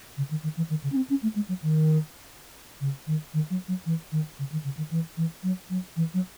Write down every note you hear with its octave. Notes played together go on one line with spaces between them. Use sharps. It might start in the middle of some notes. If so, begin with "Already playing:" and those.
C#3
D#3
D#3
E3
D#3
C#3
C#4
C4
C#4
A3
G#3
F#3
D#3
C#3
D#3
D#3
F#3
F#3
E3
D#3
C#3
D#3
C#3
D#3
E3
E3
F#3
F#3
E3
F#3